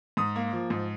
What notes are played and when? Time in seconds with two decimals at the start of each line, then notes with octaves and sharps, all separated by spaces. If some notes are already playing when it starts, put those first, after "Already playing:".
0.17 G#2 D#6
0.36 A#3
0.53 F3
0.70 G#2